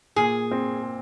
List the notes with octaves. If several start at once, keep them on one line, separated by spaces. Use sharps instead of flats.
A#2 G#4
C4